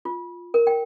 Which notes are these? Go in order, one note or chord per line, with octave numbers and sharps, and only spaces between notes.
F4
A#4
G5